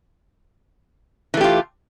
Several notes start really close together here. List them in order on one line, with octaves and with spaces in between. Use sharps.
E3 A3 G4 F4